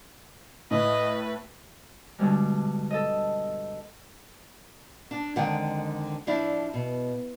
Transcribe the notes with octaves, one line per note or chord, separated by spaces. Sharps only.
A2 B4 D#5
G2 B2 D3 G3 G#3
A4 D#5
D4
F2 D3 D#3 G#3 F#5 G5
F3 D4 E4
B2